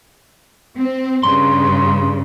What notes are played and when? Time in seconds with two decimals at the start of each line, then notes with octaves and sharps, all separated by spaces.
0.78 C4
1.23 G2 C#3 C6